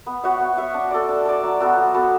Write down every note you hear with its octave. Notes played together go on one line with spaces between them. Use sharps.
B3
F#4 C#5 E5
B3
F#4 C#5 E5
D4
A4 D5
D4
A4 D5
F#3
B3 F#4 A4
F#3
B3 F#4 A4